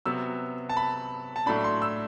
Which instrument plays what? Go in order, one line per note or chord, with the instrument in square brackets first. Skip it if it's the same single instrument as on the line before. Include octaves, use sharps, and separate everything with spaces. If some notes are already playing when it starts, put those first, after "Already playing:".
[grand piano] C3 F#3 B3 E6
A5
B5
A5
A2 F#3 A3 D4 B5
C6
E6